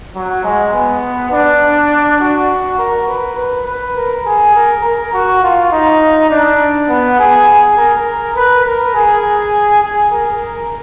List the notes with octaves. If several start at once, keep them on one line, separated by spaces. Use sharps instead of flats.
F#3
G#3
B3
D4
F#4
A#4
B4
B4
B4
A#4
G#4
A#4
A#4
F#4
F4
D#4
D4
B3
G#4
G#4
A#4
B4
A#4
G#4
G#4
A#4